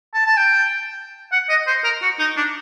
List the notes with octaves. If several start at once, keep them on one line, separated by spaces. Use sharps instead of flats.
A5
A5
G5
F#5
D#5
C5
A#4
F#4
D#4
D4